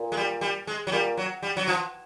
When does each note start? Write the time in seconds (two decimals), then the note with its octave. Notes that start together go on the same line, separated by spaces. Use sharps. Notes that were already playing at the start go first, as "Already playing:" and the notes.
Already playing: A#2
0.12 G#3
0.17 G3
0.41 G3
0.67 G#3
0.87 F#3
0.92 A#2 G3
1.17 F#3
1.43 G3
1.57 F#3
1.68 F3